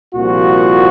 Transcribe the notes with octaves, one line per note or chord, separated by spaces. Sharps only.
C2 A#2 F3 F#4